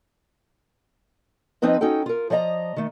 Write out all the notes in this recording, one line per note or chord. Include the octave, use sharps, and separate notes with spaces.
F3 C4 D#4 B4 D#5
C#4 D#4 F#4 A4 G5
F4 A#4
F3 D5 D#5 F5 A#5
D#3 A3